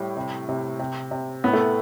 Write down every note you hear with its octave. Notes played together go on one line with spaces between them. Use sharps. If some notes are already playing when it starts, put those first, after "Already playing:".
Already playing: A2 G3
C3
C3
C3
C3
A2 B3
A3